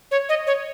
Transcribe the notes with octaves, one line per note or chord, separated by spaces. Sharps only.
C#5
D#5
C#5